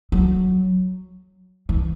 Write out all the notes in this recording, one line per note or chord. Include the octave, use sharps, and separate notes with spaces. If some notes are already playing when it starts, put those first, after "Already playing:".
F#3
E3